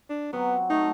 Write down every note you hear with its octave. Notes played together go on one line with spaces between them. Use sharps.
D4
F#3 B3 C4
A3 D#4